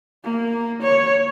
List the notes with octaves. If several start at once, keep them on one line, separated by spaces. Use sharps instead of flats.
A#3
C#5